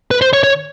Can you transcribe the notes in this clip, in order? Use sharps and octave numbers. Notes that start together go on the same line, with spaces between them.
B4
C5
C#5
C#5